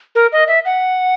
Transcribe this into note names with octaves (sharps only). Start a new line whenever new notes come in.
A#4
D#5
E5
F#5